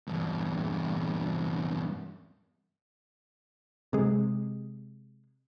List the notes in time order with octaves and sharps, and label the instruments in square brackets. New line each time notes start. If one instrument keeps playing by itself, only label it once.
[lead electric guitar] E2 G2
[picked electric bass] C3 G#3